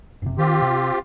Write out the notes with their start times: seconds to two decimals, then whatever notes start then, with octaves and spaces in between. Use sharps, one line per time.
0.22 F#1 C3
0.38 D#3 C4 F4 G4
0.62 C3